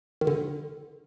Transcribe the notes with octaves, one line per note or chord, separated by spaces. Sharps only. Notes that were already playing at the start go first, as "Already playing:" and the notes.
D#3
D3